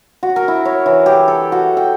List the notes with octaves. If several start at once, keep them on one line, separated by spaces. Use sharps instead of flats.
F#4
A#4
E4
C#5
E3
G4
A4
F#4
G5